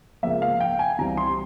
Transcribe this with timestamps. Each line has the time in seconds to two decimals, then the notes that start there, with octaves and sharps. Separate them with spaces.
0.23 C#2 C#3 F3 A#3 E5
0.42 F5
0.61 G5
0.79 G#5
0.99 C2 C3 E3 G3 A#5
1.17 C6